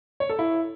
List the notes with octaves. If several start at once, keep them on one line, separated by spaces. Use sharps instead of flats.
C#5
A4
E4